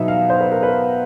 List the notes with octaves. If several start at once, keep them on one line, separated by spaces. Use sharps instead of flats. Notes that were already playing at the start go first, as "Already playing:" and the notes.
Already playing: B2 F#3 B3 D#4 E5
F5
C5
B4
A#4
B4